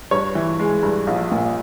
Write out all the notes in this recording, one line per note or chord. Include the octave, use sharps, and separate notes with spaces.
G2 C#5
E3
G#3
G2
A#1
A#2